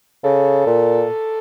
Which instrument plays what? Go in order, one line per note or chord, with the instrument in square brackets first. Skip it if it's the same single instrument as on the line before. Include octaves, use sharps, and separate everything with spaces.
[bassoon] C#3 [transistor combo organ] A4
[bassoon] A#2